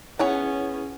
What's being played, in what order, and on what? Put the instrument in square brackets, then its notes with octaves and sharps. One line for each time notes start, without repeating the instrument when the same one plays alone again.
[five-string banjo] B3 C#5 G#5 [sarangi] C#4 [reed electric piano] E4 G#4 F#5